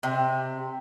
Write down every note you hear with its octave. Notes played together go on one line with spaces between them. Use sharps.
C3